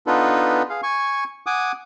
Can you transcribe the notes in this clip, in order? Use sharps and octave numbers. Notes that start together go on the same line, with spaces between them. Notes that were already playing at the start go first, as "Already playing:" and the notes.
B3 D4 D#4 F4 A4 B4
G#4 F5
G#5 C#6
F#5 G#5 D6 D#6